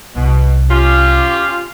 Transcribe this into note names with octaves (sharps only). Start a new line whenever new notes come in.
C2 B2
C#4 F4 G4